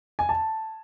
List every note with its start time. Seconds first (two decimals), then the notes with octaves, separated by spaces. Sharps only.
0.19 G#5
0.29 A5